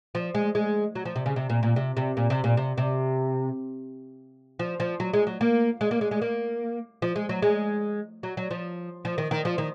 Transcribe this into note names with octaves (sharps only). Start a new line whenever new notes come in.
F3
G#3
G#3
F#3
F3
C3
C#3
C3
A#2
A#2
C3
C3
A#2
C3
A#2
C3
C3
F3
F3
F#3
G#3
F#3
A#3
G#3
A#3
G#3
G#3
A#3
F3
G#3
F#3
G#3
F#3
F#3
F3
F3
D#3
D#3
F3
D#3